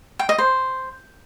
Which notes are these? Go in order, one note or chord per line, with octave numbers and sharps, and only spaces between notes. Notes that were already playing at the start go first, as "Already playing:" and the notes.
G5
D#5
C5